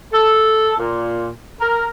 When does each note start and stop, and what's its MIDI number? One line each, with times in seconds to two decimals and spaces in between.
0.13 0.74 69
0.78 1.30 46
1.60 1.87 70